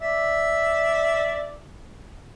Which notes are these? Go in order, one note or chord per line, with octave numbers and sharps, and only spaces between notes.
D5 E5